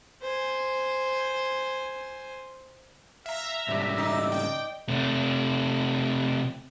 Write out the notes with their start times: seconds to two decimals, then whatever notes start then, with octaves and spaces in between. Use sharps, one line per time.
0.22 C5 G#5
3.26 E5 F5 A#5
3.68 G#2 C#3 G3 D5
3.98 D#4
4.32 G5
4.88 C3 A3